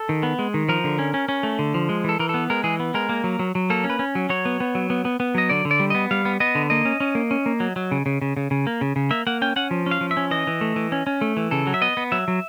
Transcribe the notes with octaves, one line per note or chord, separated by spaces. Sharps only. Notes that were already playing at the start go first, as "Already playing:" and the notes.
Already playing: A4
D#3
B3
G#3
D#3
F3 A#4
D3
C#4
C#4
C#4
A3
D3
F3
G#3
E3 A4
E3 A#4
B3 A4
G#3 A#4
E3 G#4
B3
G#3 A#4
A#3
F#3
F#3
F#3
A#3 A4
C#4
B4
C#4
F#3
F#3 C#5
B3
B3
F#3
B3
B3
B3
F#3 D#5
D3 D5
D3
D5
G3
B3 D#5
G3 F5
B3
B3 D#5
D3
A#3 D#5
C#4
C#4
A#3
C#4
A#3
F#3
F#3
C#3
C#3
C#3
C#3
C#3
A#3
C#3
C#3
A#3 E5
A#3 F#5
C#4 G5
C#4 F#5
F3
C#4 F5
F3
E5
C#4
E3 D#5
E3
A3
E3
C#4
C#4
A3
E3
C#3 A4
F#3
E5
B3 D#5
B3
F#3 E5
F#3